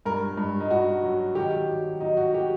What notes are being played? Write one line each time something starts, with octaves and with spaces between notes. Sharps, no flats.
G2 A#4
G2
D#4
G2 F#4
F#3
D#3 G4
F#3
F#3 D#4
F#4
G4